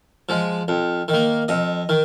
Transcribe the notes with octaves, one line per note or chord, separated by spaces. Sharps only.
F3 G#3
F2
D#3
A#3
F2 D#5
D#3